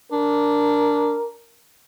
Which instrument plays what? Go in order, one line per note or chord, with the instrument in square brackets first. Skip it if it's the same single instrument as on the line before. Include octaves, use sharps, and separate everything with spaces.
[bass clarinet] D4 [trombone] A#4